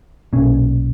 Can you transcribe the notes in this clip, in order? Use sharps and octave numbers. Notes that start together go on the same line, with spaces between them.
B1 A#2 C#4